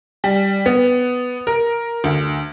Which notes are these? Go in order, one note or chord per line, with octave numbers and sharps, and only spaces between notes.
G3
B3
A#4
D2